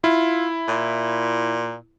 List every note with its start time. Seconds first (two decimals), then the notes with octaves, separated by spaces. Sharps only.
0.04 E4 F4
0.68 A#2